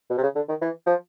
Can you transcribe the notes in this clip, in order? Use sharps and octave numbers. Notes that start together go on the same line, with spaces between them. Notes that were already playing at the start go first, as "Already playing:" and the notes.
B2
C3
C#3
D3
D#3
E3
F3